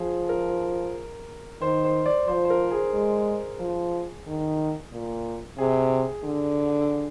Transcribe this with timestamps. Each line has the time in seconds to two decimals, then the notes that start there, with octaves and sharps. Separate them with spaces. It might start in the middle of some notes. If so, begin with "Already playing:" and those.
Already playing: F3 G#4
0.29 A#4
1.61 D#3 C5
1.84 C5
2.06 D5
2.27 F3 C5
2.45 C5
2.50 A#4
2.71 G#4
2.93 G#3
3.60 F3
4.27 D#3
4.92 A#2
5.58 C3 G#4
6.24 D3